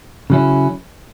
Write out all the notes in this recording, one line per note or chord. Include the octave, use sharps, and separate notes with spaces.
C#3 F#3 C#4 E4